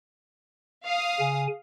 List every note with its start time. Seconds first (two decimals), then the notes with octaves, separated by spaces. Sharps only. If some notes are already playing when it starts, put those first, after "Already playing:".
0.85 F5 D#6
1.20 C#3 G#5